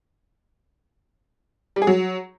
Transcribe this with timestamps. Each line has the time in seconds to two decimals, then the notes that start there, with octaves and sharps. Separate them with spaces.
1.76 G3
1.82 G#4
1.87 F#3